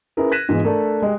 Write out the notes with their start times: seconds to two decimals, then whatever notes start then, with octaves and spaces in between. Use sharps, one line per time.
0.17 C#4 E4 G#4 A#4 B4
0.32 F#6 G#6 A#6 B6 D#7 E7
0.49 G#2 B2 E3 F4 G#4
0.64 A3 D4 A4 A#4
1.02 G#3 G4